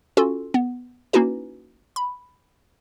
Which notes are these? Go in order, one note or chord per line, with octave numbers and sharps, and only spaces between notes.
C#4 F4 F#4 A4
B3
A#3 C#4 D#4 E4 F#4 B4
B5